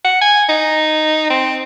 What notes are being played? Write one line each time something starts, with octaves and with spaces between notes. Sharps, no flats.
F#5
G#5
D#4
C4